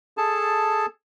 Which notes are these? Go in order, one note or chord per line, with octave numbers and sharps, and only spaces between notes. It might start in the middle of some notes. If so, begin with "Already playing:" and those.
G#4 A4 A5